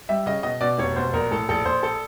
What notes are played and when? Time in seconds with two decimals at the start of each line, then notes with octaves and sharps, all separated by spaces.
0.09 G3 E5
0.26 C#3 D#5
0.43 B2 D#5
0.61 B2 D5
0.78 F1 C#5
0.96 B2 C5
1.13 A#1 A#4
1.31 A2 A4
1.49 A#1 A4
1.65 A#1 C5
1.83 A4